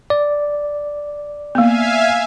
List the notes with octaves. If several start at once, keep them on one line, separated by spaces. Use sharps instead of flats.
D5
A#3 B3 E5 F5 G#5